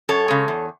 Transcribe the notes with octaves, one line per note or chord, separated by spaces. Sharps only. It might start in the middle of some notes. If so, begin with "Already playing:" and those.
F#2 A4 C#5
C#3 G#3
E2